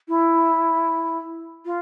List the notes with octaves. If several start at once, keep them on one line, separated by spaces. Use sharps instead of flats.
E4
F4